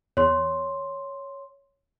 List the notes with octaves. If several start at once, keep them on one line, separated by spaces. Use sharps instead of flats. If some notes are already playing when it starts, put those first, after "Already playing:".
E2 C#5 C6